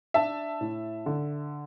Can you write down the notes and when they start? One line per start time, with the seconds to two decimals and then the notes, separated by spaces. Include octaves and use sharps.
0.14 D4 E5 A5
0.61 A2
1.06 D3